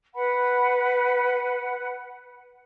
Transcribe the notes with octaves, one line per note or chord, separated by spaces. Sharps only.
B4 F#5 B5